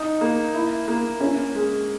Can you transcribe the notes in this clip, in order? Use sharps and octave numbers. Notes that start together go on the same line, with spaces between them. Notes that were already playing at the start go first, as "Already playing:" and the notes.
Already playing: D#4
A#3
E4
A#3
C#4
G#3